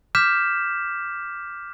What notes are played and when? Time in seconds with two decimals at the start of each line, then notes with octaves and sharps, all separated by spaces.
0.15 D6 F6 G6 B6 E7